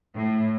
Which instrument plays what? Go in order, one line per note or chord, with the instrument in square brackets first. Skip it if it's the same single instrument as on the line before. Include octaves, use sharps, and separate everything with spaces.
[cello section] A2